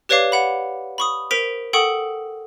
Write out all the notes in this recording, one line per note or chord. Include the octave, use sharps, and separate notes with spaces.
G4 B4 C#5 D5 F5 D6
F#5 B5
B5 C#6 D#6
A#4 C5 B6 D7 F7
A4 F#5 G5 C#6 D#6